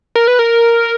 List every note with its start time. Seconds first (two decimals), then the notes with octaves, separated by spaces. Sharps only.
0.15 A#4
0.28 B4
0.39 A#4